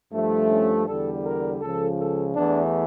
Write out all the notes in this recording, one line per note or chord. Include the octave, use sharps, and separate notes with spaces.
G2 F3 A3
C#4
E2 D3 G3 A4
A#4
C#2 C#3 F3 A4
A4
E2 E3 A3 D4